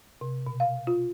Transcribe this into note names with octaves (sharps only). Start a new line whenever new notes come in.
C3
B2
F5
F4